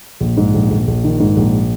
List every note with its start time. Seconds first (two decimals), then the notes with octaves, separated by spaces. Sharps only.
0.20 A#1
0.37 G#2
0.54 A#1
0.71 A#1
0.87 A#1
1.04 D#3
1.20 G#2
1.36 A#1